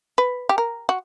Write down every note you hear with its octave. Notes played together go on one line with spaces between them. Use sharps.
B4
G4
A#4
F#4